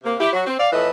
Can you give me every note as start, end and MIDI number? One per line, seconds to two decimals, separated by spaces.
0.04 0.15 48
0.04 0.15 58
0.20 0.29 64
0.20 0.29 67
0.33 0.44 54
0.33 0.44 66
0.47 0.57 60
0.59 0.68 74
0.59 0.68 77
0.72 0.90 41
0.72 0.90 45
0.72 0.90 52
0.72 0.90 69
0.72 0.90 71
0.72 0.90 75